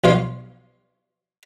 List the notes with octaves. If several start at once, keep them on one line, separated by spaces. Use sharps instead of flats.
B1 F4 C#5 F5